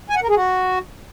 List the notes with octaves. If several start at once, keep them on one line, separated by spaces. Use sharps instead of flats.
G#5
F#5
A#4
G#4
F#4